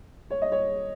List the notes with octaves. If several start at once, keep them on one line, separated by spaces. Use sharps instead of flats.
C#5
D#5
C#5